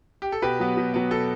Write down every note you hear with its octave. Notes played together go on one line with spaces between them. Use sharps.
G4
A4
B2 G4 B4
F#3 B3
B2
F#3 B3
B2 A4